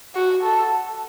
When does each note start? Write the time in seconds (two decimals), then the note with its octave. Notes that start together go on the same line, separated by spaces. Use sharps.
0.15 F#4
0.43 A4